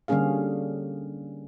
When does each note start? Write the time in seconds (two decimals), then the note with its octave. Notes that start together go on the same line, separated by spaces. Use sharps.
0.08 D3 G3 A#3 C#4 G#4 F5